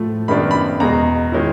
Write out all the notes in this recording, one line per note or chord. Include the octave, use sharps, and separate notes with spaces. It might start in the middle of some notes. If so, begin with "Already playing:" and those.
Already playing: A2 F3 A3
F#2 D#3 G#3 B3 D4 B5
B5
E2 B2 G#3 A#5
D#3 G#3 C#4 E4